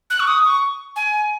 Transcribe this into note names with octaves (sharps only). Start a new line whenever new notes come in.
F#6
C#6
D#6
C#6
G#5